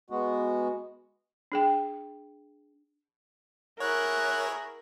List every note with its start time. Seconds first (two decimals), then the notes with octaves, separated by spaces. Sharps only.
0.10 G#3 B3 F#4
1.52 D4 G#4 G5
3.80 E4 G#4 A#4 C#5 F#5 F#6